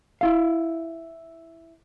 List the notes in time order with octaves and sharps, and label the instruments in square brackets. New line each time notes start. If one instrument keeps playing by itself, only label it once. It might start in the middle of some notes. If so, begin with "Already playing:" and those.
[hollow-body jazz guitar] E4 F5